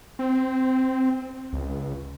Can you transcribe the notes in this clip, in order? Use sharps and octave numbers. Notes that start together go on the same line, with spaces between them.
C4
C#2